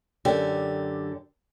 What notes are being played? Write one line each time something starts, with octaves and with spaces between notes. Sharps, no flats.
F#2 D3 G4